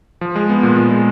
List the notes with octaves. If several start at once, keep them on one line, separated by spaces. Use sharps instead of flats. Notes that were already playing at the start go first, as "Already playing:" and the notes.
F3
G#3
B3
A#2
F3
G#3